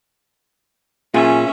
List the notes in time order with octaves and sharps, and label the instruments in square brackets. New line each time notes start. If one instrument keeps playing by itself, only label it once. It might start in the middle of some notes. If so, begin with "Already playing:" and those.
[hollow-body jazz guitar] A#2 F4 G#4 [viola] C#4 E5